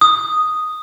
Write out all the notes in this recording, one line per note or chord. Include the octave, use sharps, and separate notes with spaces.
D#6